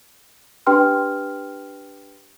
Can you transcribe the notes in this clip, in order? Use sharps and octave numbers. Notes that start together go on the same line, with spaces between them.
D4 G4 B4 G5 C6 F6